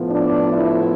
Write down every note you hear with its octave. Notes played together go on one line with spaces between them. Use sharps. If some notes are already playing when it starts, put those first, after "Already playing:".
Already playing: A2 F3 B3
D4
E4